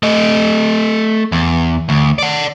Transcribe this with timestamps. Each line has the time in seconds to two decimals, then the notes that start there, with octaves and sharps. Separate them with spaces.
0.03 A3 D#5
1.32 E2
1.89 D2
2.19 D5 F#5